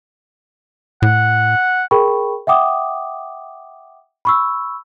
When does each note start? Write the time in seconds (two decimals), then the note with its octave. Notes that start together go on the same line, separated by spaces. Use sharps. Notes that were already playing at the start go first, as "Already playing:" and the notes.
1.02 A2 F#5
1.91 G#4 A#4 G5 B5 C#6
2.47 E5 F#5 G5 D6 D#6
4.25 B5 C#6 E6